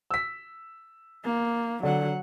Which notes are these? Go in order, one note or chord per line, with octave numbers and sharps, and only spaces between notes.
E6 B6
A#3
D3 F#3 F#5